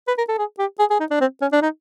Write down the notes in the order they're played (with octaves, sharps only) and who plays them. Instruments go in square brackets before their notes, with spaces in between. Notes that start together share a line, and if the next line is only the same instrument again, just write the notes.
[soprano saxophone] B4
A#4
A4
G#4
G4
G#4
G#4
D#4
D4
C4
C#4
D4
D#4